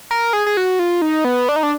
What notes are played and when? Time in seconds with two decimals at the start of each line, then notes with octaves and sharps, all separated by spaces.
0.11 A#4
0.33 G#4
0.46 G#4
0.57 F#4
0.79 F4
1.02 D#4
1.25 B3
1.49 D4
1.56 D#4
1.63 D4